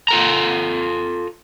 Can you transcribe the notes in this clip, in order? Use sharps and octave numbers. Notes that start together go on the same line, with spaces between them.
F4 A4 A#5